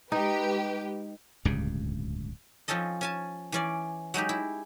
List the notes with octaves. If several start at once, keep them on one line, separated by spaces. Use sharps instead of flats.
G#3 D#4 G4 B4
D1 C#2 G2 C#3
F3 C4 C#4 A4 D#5
C#4 G#5 A5
E3 C#4 D5
F#3 G#3 D#4 G4
E4